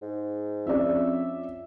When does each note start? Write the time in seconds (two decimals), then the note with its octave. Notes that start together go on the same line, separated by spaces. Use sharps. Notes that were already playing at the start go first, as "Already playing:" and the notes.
0.02 G#2
0.67 F2 C#4 D5 E5